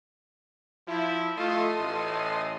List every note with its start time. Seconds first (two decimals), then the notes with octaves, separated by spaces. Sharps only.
0.88 F3 E4
1.37 A3 F4 A4 D#5 C6
1.78 A1